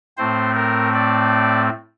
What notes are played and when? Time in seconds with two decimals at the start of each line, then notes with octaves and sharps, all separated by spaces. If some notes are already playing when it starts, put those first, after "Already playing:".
0.17 A2 A3 C4 C5
0.55 A#4
0.94 D5